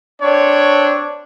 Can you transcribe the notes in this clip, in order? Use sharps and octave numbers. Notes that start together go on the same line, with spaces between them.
C4 D4 C#5